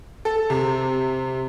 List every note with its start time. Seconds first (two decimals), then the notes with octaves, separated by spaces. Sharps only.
0.25 A4
0.50 C3